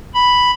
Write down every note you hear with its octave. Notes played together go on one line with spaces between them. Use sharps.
B5